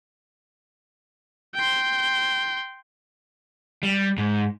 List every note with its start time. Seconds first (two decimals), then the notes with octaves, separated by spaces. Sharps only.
1.55 G5 C6
3.83 G3
4.18 G#2